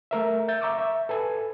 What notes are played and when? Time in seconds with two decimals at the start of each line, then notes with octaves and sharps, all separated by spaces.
0.11 A3 A#4 E5
0.48 E5 G6 A6
0.61 E5 A#5 C#6 D6 E6
0.78 E5
1.09 A4 B4 G#5